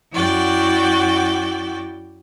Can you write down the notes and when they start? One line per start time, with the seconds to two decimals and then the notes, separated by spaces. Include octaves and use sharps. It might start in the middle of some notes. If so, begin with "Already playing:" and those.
0.12 F#2 E4 F#4 D5 G5